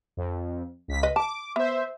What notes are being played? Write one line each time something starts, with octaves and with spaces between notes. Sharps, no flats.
F2
C#2 B6
B4 D#5
A5 D6
B3 C5 E5